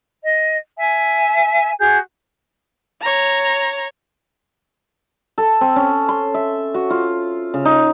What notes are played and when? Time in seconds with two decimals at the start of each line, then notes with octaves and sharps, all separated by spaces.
0.22 D#5
0.77 E5 G#5
1.78 F#4 G#4 G6
3.01 C#5 A#5
5.38 A4
5.61 C4
5.76 C#4
6.09 C6
6.34 E5
6.74 F#4
6.90 F4
7.54 C#3
7.65 D#4